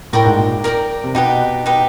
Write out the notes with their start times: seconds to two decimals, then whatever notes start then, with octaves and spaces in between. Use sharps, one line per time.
0.13 A2 A#4 D5 G5 A#5
0.25 G#2
0.38 A#2
0.64 A#4 D5 G5 A#5
1.04 C3
1.15 B2 D#4 G4 B4
1.66 D#4 G4 B4